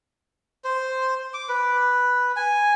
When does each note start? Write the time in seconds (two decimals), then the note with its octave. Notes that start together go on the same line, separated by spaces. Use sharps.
0.64 C5
1.34 D6
1.49 B4
2.36 G#5